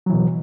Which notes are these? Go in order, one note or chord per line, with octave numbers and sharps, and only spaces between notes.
B2 E3 F#3